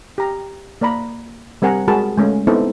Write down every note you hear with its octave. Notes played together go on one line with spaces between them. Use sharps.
G4 A#5
A#3 D5 A#5 B5
G3 C4 A#4 F#5 G#5 A#5
G#3 F#4 G#4 A#4 A5 B5
G#3 A3 C#4 F5
B3 C4 D#4 E4 A4 C5